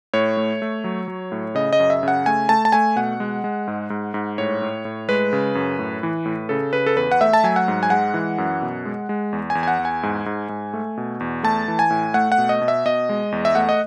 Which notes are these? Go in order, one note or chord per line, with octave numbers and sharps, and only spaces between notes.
A2 C#5
A3
A3
F#3
F#3
A2
C#3 D#5
D#5
F#2
E5
C#3 F#5
A3 G#5
A3 A5
A5
A3 G#5
B2 F#5
G#3
G#3
G#2
G#2
G#2
A2 C#5
A2
A2
G#3 B4
C#3
F#2
A2
E3
A2
C#3 A4
C#3 B4
A4
E2 B4
F#5
A3 E5
A5
F#3 G#5
F#5
G#2
G#5
G#3 F#5
E3
F#2
B2
G#3
G#3
E2
G#5
E2
G#5
F#5
E2
G#5
G#2
G#2
G#2
A3
B2
E2
A3 A5
E3
G#5
A2
A3 F#5
F#5
B2
D#5
B2
E5
B2 D#5
G#3
E2
E5
A3 F#5
D#5